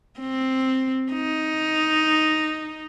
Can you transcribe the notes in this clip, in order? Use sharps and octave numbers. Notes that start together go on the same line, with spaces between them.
C4
D#4